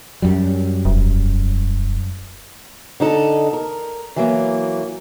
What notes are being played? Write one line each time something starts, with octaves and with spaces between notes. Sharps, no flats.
F#2 F#3 G3
E1
D3 D#4 A4
A#4
E3 F#3 A#3